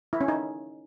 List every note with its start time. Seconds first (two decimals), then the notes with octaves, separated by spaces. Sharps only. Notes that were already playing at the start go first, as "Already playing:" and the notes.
0.13 E4
0.21 C#4
0.28 D#4